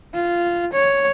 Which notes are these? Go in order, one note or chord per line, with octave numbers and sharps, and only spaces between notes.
F4
C#5